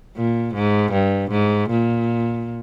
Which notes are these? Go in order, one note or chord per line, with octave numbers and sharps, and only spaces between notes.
A#2
G#2
G2
G#2
A#2